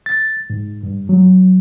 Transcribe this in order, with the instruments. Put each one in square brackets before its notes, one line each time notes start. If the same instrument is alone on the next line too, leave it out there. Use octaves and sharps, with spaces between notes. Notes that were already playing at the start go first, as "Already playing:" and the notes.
[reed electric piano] A6
G#2
G2
F#3